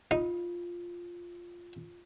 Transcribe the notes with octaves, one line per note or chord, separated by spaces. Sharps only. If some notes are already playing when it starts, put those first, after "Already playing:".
D#4 F4